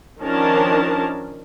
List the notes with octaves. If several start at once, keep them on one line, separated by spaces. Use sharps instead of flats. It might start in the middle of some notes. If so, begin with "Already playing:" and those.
D#3 F3 C#4 D4 A#4 A5